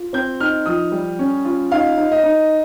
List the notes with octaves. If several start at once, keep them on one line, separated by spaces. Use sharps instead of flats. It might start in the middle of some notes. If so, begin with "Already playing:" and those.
Already playing: F4
C4 G6
D#4 F6
F3 D#6
G3
C#4
F4
D#4 F5
D#4
D#5
D#4